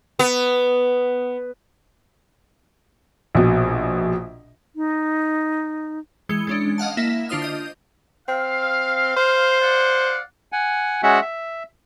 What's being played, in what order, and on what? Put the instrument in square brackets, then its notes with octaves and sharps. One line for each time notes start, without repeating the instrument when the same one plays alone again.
[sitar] B3
[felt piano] A#1 B2
[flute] D#4
[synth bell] E3 G#3 C#7 G7
G#3 C#4 D4
D#5 F5 F#5 A5
A#3 E4 E5
D3 D4 F4 C5 D#6 F6
D#5 G6
[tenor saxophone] C4 [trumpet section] F5
[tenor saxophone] C5
[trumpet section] D5 F5 F#5
[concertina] F#5 G#5
G#3 C#4 F#4 E5 F#5
E5